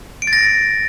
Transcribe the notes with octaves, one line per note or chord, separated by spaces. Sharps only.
D7
A6
A#6